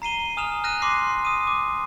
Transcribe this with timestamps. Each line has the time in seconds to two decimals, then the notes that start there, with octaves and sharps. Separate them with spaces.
0.02 A#5 C7 D#7 G7
0.37 G#5 D#6 F6 E7 F7
0.64 F6 F#6 A#6 D#7
0.82 C6 D6 F#6 C7
1.25 D#6 D#7
1.47 D6